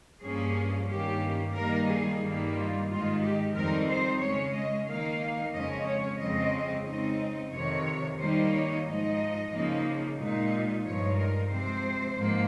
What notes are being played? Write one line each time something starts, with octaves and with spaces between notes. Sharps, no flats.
G2 F3 A#3 C#4 G#4
G2 D#3 A#3 C#4 G4
D#3 G3 A#3 D#4 A#4
G#4
G2 D#3 G3 A#3 D#4
F4
G#2 D#3 G#3 D#4 F4
G4
F2 D#3 G3 C4 D#4 A#4
C5
C#3 G#3 C#4 C#5
D#5
D#3 A#3 D#4 F5
F2 C#3 G#3 C#4 D#5
C#5
F2 C#3 F3 G#3 C4 D#5
C#3 G#3 C4 D#4 D#5
F2 C3 D#3 C#5
D#3 G3 A#3 D#4 C5
C#5
G#2 F3 G#3 D#4 D#5
C#3 F3 A#3 D#4
A#2 G#3 D#4
G2 F3 G#3 D#4 C#5
A#4
C3 F3 G#3 C4 C5
G#2 F3 A#3